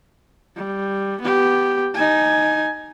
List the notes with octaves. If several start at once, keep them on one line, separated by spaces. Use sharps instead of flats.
G3
B3 G4
D#4 G#5